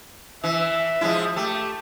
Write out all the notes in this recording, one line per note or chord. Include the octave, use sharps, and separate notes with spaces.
E3 E5
F3 G#3 E4
A3 G4